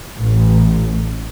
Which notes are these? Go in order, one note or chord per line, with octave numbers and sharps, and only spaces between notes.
A1